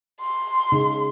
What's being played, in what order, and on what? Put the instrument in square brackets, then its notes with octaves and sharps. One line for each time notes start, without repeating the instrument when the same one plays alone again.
[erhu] C6
[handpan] C#3 D#4